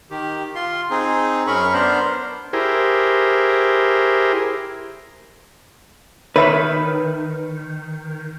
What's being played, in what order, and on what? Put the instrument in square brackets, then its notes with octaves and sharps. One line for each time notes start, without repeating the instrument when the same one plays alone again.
[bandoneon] D#3 G4
F4 C6
C4 D#4 G#4
F#2 C#4 A#4 B5 C#6
B3 D4 A#4 C5
[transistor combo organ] E4 G4 G#4 A#4 C5
[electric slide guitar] D#3 [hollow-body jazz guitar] B4 [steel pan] C#5 E5 B5